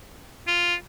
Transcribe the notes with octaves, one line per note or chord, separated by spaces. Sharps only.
F4